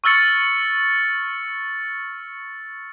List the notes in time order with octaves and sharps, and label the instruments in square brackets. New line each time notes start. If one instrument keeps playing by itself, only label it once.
[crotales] C#6 E6 F6 A6 C#7